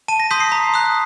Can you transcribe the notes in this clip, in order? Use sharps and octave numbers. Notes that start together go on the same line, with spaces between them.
A5 D#7
A#6
C6 D#6 G6 B6
C7
A#5
D#6 F#6